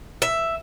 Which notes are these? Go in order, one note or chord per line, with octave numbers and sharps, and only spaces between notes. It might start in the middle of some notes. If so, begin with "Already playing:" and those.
E5